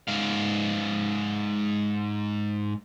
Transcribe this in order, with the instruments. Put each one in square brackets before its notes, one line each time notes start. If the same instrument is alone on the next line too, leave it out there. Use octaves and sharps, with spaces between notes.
[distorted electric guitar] G#2 F5